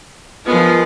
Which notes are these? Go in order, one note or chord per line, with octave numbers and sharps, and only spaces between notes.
F3 G#3 B3 F4 A#4